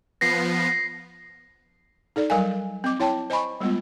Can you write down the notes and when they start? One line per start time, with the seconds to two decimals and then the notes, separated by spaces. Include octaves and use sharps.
0.21 F3 B3 A#6 C7
2.16 D#4 A4 D5
2.30 F#3 G3 A#4 F5 G#5
2.84 C4 D#5 D6
3.00 E4 C#5 G5 A5
3.30 C5 D#5 G#5 B5 C#6
3.61 G3 G#3 B3 F4